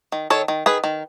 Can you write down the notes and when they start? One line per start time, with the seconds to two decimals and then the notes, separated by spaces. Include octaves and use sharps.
0.12 D#3
0.30 D#3 A4 C#5
0.48 D#3
0.66 D#3 G#4 B4
0.84 D#3